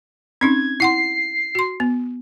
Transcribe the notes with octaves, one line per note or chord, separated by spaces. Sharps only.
C4 C#4 D#4 G#6
E4 F#5 C6 C7
F#4 C6
B3